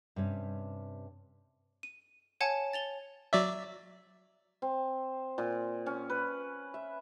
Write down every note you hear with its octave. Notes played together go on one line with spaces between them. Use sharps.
G2 C3 C#4
D#7
C#5 F#5 G#5 A5 G#6 C#7
A6 F7 G7
F#3 D5 E5
C4
A#2
C#4
B4
E5